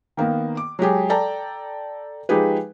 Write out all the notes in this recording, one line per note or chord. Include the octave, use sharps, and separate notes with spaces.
D#3 A#3 B3
D6
F#3 G#3 G4 G#4
A4 D5 G5 A5 A#5
F3 G#3 D#4 G4 G#4 B4